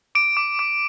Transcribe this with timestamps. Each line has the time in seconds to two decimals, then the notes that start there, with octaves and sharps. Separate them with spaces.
0.15 D6 D7
0.37 D6
0.59 D6